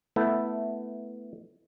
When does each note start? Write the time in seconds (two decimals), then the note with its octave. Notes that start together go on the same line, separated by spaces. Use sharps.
0.16 A3 B3 E4